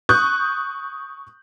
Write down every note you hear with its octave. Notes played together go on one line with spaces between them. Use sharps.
C#6 D#6 F#6 G6